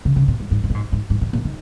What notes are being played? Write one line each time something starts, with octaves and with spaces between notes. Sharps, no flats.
C#3
C#3
A#2
G#2
G#2
G#2
A#2
G#2
G#2
G#2
A#2
A#2
D#3